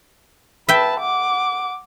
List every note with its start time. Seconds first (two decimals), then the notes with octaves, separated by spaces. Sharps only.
0.69 B4 E5 G5 A5
1.00 F#5 D6